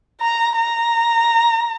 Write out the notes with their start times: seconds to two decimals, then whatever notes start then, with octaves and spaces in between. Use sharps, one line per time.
0.21 A#5
0.57 A#5